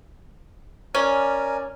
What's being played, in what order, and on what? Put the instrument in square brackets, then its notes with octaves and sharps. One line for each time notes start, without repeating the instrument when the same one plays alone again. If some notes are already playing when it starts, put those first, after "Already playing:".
[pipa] C#4 [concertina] A#4 D5 G#5